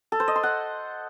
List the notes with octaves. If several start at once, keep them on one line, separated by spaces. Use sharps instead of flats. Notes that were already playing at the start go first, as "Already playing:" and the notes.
A4
C5
D#5
C6
F#5